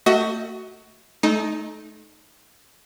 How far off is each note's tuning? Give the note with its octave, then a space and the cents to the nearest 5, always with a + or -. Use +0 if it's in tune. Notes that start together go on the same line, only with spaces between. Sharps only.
A3 +30 F#4 +10 D#5 +40
A3 -30 D#4 +0